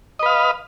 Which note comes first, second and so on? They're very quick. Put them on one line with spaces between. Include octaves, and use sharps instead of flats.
D#5 B4 F5